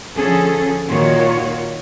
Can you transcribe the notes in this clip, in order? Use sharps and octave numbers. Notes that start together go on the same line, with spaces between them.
D3 F3 C#4 G#4 A4
A#2 D#3 F4 F#4 C#5